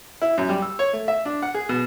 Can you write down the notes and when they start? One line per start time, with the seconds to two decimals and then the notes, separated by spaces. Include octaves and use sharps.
0.22 E4
0.38 F#2
0.49 G3
0.62 E6
0.79 C#5
0.93 A3
1.08 E5
1.25 D4
1.42 F#5
1.54 G#4
1.69 B2